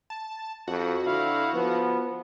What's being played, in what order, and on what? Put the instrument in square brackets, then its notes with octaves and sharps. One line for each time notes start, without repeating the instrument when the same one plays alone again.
[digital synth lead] A5
[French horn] F2 [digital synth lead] F#4
[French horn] D3 [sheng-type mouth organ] E4 F5
[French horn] F3 [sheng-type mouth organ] B3